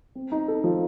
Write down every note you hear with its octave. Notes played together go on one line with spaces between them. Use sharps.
C4
D#4
A4
F3